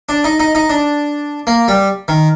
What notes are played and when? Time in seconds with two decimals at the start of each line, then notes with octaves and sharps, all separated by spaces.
0.09 D4
0.24 D#4
0.40 D#4
0.55 D#4
0.70 D4
1.47 A#3
1.68 G3
2.08 D#3